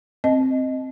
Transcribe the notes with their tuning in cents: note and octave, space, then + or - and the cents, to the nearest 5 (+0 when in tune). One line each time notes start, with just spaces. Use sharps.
C4 +0 D#5 +0